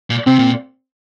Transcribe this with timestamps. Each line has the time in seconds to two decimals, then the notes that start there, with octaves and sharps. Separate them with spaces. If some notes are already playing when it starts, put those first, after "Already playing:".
0.10 A#2
0.26 C3 C4
0.39 A#2